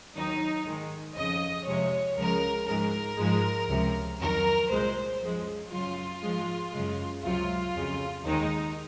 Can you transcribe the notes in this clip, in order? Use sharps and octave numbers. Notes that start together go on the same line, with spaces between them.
D#2 D#3 F#3 D#4
G#2 D#3 G#3
F2 C#3 F3 D#5
F2 C3 F3 G#3 C#5
C#2 C#3 F3 G#3 A#4
G#2 F3 G#3 A#4
G#2 F3 G#3
C#2 C3 F3
F2 D#3 F#3 A#4
C2 A#2 G#3 C5
F#2 F3 G#3
F#2 C#3 F#3 F4
G#2 F3 G#3
F#2 C#3 G#3
C#2 C3 F#3 F4
F2 C#3 F#3
D#2 D#3 G#3 D#4